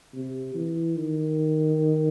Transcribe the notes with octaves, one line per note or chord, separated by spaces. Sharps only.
C3
E3
D#3